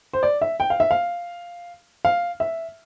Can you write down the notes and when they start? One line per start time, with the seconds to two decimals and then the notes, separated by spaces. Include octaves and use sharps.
0.13 C5
0.23 D5
0.41 E5
0.60 G5
0.70 F5
0.80 E5
0.91 F5
2.05 F5
2.40 E5